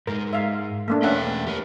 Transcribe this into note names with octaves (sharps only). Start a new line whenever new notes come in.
G#2 G#3 A#4
E5 F5
A3 A#3 D4
E2 C#4 B4 E5 F#5 G5
G4 A#4 C#5